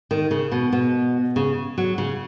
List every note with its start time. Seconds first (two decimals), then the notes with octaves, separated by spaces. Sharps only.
0.11 D#3
0.31 C#3
0.52 B2
0.73 B2
1.36 C#3
1.78 F#3
1.98 C#3